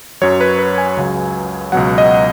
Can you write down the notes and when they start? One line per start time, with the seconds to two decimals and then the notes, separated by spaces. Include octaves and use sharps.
0.22 F#2 F#3 C#5
0.41 B4
0.59 B4
0.78 G#5
0.97 C#2 C#3 F#3
1.72 C#2 B2 F#3 F#5
1.98 D#5